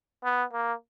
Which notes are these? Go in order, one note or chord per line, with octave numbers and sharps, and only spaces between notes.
B3
A#3